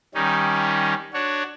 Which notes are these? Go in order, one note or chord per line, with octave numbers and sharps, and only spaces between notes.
D#3 G3 C#4 D#4
D4 F#4 C#5